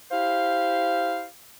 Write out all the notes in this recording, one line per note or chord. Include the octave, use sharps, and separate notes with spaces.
E4 G4 C5 F5